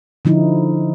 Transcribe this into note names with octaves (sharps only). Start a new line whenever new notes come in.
D3 F3 D#4 E4